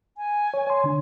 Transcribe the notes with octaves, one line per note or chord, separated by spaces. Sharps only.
G#5
C#5
C#5 C6
D3 D4